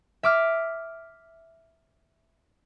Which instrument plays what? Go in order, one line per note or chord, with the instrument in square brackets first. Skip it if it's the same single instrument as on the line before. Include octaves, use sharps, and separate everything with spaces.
[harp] E5 D6 F6